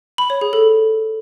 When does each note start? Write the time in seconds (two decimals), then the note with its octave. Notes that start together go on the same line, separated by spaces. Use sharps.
0.18 B5
0.30 C#5
0.41 G#4
0.53 A4